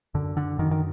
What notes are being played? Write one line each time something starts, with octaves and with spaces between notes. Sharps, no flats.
F#2 D3
D3
F#2 D#3
D#3